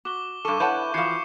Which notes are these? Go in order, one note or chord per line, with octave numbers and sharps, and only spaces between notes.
F#4 D6 G7
G2 A4 C#6 D6 E7
E4 B4 C#5 F#5 A5 G6
E3 F3 F#4 E5 F5 C7 C#7